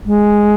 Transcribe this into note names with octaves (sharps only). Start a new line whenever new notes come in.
G#3